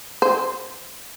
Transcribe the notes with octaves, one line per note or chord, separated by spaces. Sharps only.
C5